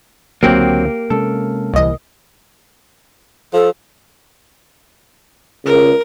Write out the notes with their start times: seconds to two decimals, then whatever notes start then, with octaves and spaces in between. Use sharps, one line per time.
0.43 C#2 D3 F#3 A#3 C4 G4
1.10 C3 G#3 C#4 A4
1.74 D1 C2 E3 D#5
3.53 F3 A4
5.65 C#2 A#4